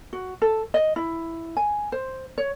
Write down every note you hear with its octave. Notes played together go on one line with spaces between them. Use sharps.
F#4
A4
D#5
E4
G#5
C5
C#5